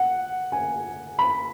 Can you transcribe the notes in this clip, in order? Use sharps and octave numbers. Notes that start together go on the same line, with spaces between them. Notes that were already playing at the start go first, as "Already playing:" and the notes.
Already playing: F#5
G#5
B5